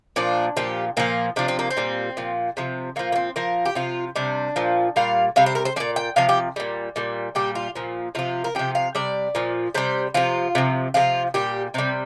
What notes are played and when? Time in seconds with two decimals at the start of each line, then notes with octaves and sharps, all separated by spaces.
0.16 A#2 F3 D4
0.57 A#2 F3 G4
0.97 A#2 F3 A#3
1.36 C3 F3 D4
1.48 C4
1.59 A#3
1.71 C4
1.77 A#2 G3
2.17 A#2 F3
2.57 C3 F3
2.96 A#2 F3 A#3
3.12 A#3
3.16 C4
3.36 A#2 F3 A#4
3.65 G4
3.75 C3 F3 F4
4.16 C3 G3 D4
4.56 A#2 F3
4.96 A#2 G3 F5
5.36 C3 G3 F5
5.46 C5
5.55 A#4
5.65 C5
5.76 A#2 F3 D5
5.96 G5
6.16 C3 F3 F5
6.29 G4
6.56 A#2 G3
6.96 A#2 G3
7.35 A#2 G3 G4
7.55 F4
7.75 A#2 F3
8.15 C3 F3 F4
8.44 A#4
8.55 C3 F3 G4
8.75 F5
8.95 C3 G3 D5
9.35 A#2 F3
9.75 C3 G3 C5
10.14 C3 F3 F4
10.55 C3 F3
10.94 C3 F3 F4
11.34 A#2 G3 G4
11.74 C3 G3 C4